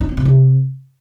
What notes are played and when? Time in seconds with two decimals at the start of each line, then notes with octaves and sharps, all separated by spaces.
0.01 D#4
0.09 C4
0.17 B2
0.25 C3